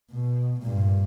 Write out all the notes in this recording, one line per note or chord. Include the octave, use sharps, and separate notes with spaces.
B2
G2 A#2